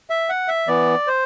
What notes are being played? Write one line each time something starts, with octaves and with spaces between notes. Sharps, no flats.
E5
F#5
E5
E3 B3 D5
C5